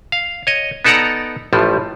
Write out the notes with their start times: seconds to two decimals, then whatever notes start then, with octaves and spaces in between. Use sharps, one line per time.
0.12 F5
0.47 C#5 D#5
0.85 B3 D#4 A4 D5 F#5 A#5
1.53 A1 A2 F3 G3